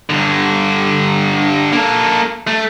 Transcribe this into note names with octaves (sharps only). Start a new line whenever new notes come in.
G2 D3
A#3 A4
A3